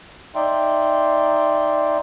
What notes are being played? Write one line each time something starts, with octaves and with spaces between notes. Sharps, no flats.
D#4 D5 E5 G5 C6